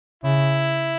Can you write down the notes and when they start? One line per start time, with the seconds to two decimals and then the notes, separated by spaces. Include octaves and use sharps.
0.24 C#3 E4